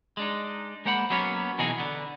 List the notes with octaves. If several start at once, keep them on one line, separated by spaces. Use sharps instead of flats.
G#3 D4 D#4
G#3 A#3 C5 F#5 A#5 B5
F#3 A#3 B3 C#4 C#5
B2 E3 D#4 F#4 G#4
D3 B3